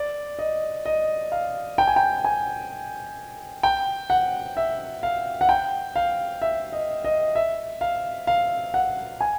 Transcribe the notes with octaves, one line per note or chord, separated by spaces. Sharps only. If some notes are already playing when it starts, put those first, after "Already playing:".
Already playing: D5
D#5
D#5
F5
G5
G#5
G5
G#5
G5
F#5
E5
F5
F#5
G5
F5
E5
D#5
D#5
E5
F5
F5
F#5
G#5